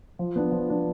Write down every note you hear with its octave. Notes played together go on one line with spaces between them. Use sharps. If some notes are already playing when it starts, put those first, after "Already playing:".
F3
B3 D4
F3
B3 D4